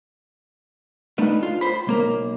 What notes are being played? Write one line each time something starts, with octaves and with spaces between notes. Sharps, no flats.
A3 D4 D#4 B4
F4
C5 B5
B1 A#3 A#4